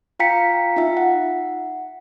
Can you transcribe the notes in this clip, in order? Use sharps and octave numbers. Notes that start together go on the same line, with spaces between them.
F4 F5 G5 A#5 B6 C#7
D#4 F4 E5
F#5